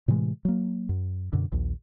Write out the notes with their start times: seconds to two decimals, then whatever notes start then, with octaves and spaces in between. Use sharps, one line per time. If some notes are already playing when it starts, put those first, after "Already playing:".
0.08 A2 C3 E3 G#3
0.45 F#3 A#3
0.89 F#2
1.33 F#2 B2 D3
1.52 A#1 D#2